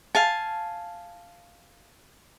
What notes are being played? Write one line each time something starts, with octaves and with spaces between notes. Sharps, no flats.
F5 G#5 A5